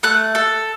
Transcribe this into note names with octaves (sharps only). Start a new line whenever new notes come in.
A3 F#6
A4